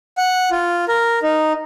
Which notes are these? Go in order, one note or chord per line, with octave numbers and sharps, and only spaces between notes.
F#5
F4
A#4
D#4